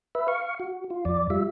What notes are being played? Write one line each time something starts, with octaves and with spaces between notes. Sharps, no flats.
B4 E5
F5 C#6
F#4
F4
F2 D5
G3 F4 E5